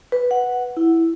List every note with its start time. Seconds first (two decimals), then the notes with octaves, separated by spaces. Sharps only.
0.12 B4
0.31 F#5
0.77 E4